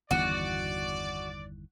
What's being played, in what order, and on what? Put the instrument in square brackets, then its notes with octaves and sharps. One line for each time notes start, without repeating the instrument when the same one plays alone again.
[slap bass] G1 E2 D#3 [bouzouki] F#4 [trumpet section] D5